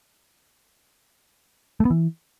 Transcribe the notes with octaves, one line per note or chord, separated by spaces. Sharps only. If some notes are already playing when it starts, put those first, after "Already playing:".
A3
B3
E3